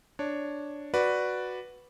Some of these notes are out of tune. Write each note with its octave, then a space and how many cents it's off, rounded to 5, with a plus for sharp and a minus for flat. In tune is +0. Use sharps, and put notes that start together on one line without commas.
D4 +0 C#5 +0
F#4 +0 B4 +0 D5 +0